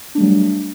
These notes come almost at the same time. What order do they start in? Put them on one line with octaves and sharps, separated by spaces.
D4 A3 G3 F#3